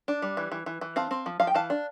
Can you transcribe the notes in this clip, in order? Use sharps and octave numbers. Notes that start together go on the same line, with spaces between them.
D4
G3
E3
E3
E3
E3
C4 F5 A5
C4
F3
F3 F5
G5
E3 F5 A5
D4